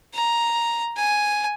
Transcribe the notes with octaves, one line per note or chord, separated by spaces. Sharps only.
A#5
G#5